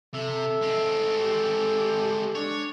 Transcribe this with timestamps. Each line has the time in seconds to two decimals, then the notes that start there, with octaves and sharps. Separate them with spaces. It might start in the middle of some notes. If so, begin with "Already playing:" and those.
0.14 C3 A4 E5
0.63 G#3 C4
1.19 G4
2.36 D4 C#5